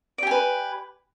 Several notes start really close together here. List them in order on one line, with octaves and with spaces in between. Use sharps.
D5 G4 G#5 B4